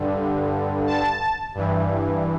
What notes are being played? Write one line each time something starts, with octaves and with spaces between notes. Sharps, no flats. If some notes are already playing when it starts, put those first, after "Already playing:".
Already playing: G2 D3
A5
G2 E3